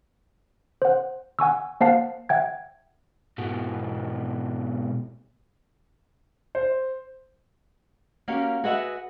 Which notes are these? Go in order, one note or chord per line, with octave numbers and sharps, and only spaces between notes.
C5 F#5
F#5 G#5 C#6 E6
A#3 C5 F5 F#5 A5 C7
E5 F#5 G5 G#6
G#2 B2
C5
A#3 C#4 F#4 G4 F5
F#4 G#4 B4 D#5 E5 F#5